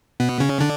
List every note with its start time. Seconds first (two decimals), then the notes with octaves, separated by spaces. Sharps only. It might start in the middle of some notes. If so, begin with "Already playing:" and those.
0.20 B2 B3
0.40 C#3 C#4
0.60 D3 D4